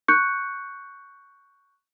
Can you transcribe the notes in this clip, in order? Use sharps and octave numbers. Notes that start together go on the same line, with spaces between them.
C#6 F#6 G6 C#7